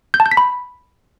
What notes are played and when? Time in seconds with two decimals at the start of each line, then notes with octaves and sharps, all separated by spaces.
0.14 G6
0.20 A5
0.26 G6
0.31 B6
0.37 B5